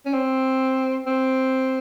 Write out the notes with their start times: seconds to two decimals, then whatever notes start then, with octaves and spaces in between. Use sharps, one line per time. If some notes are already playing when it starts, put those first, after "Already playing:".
0.06 C#4
0.13 C4
1.06 C4